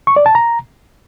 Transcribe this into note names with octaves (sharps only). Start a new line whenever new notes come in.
C#6
D5
A5
A#5